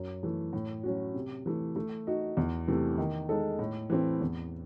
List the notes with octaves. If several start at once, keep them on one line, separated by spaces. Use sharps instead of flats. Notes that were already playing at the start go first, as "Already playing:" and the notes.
Already playing: F#2
E3 A3
A2
F#3 C#4 F#4
C3
E3 A3
A3
D#4 F#4
E2
C3 E3 A3
D#3
G#3 D#4 A4
A2
E3 A3 C4
E2